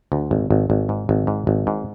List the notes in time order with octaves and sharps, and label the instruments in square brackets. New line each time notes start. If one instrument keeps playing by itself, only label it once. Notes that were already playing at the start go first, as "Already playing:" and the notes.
[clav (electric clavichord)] D2
G#1
G#1
G#1
G#2
G#1
G#2
G#1
G#2